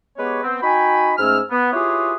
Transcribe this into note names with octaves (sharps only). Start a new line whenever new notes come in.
G#3 B3 G4 B4 C#5
B3 C4
D#4 F#4 G5 G#5 B5
G#2 A3 C#4 E6 F6
B3
E4 F4 G4 G#4 B4 C#5